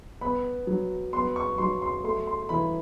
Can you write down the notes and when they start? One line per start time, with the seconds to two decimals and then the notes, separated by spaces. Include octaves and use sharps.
0.21 B3 B5
0.67 F#3
1.13 B3 C6
1.36 C#6
1.58 F#3 C6
1.82 C6
2.04 A3 C6
2.27 C6
2.49 E3 B5